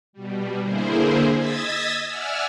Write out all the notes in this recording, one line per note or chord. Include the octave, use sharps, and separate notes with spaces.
B2 G3
D3 A#3 E4 G#4 C5
D#5 D#6 E6 G#6 A6 B6
D5 E5 F#5 G#5 E6 F6